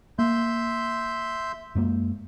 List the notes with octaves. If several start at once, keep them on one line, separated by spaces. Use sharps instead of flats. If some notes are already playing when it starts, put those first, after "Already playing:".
A#3 E5 C6 G6
F#2 G#3 A#3